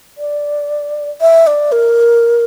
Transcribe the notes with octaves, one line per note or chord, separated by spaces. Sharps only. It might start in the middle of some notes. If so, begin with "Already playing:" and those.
D5
E5
D5
A#4